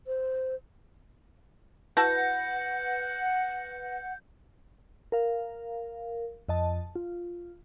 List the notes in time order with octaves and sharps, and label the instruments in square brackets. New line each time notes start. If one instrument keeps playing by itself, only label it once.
[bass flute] C5
[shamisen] E4 F#4 A5 [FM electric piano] B4 A#6 [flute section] F#5 [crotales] G6
[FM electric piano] A#4 F5
F2 D#5 A5
F4